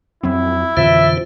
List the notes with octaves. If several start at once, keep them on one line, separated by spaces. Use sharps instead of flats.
F2 F#3 C4 E4
F2 B2 D3 E3 F4 C5 E5